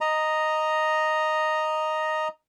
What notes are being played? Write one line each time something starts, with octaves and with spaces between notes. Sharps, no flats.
D#5 A#5